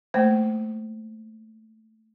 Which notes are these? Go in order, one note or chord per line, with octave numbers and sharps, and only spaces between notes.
A3 A#3 C5